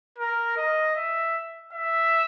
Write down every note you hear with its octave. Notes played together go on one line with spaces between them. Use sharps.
A#4
D#5
E5
E5